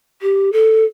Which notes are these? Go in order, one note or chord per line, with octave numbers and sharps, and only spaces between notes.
G4
A4